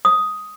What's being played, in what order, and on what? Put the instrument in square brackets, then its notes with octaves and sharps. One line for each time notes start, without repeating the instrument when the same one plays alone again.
[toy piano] D#6